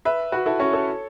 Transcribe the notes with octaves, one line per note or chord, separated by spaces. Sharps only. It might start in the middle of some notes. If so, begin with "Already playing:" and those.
B4 E5
F#4 B4
E4 A4
C#4 F#4
A4 C#5